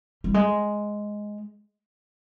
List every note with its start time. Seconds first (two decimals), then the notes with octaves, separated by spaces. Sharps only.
0.24 G3
0.34 G#3